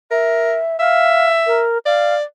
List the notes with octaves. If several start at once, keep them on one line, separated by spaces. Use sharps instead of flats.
A#4 E5
E5 F5
A#4
D5 F5